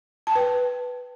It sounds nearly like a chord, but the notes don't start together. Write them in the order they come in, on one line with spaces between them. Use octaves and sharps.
A5 G5 B4